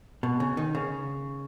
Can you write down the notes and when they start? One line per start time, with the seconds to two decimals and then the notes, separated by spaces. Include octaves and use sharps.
0.23 B2
0.40 C#3
0.57 D#3
0.75 C#3